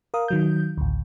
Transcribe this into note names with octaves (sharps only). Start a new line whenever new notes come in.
A#4 F5 D#6
D#3 F#3 G6
A1 D2